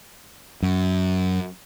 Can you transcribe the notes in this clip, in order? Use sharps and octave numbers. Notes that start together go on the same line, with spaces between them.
F#2